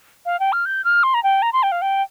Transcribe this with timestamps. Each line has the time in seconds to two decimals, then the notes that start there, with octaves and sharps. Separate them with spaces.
0.26 F5
0.40 G5
0.52 F6
0.66 G6
0.84 F6
1.03 C6
1.14 A#5
1.23 G5
1.42 A#5
1.53 C6
1.63 G5
1.72 F5
1.82 G5